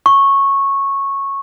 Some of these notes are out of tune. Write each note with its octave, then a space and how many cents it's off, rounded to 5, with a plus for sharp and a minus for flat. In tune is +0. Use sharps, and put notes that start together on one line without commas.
C#6 -10